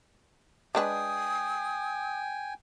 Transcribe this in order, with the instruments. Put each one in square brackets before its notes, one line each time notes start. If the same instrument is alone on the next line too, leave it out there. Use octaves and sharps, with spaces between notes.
[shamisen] G#3 D4 B4 [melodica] G5 G#5 [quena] D#6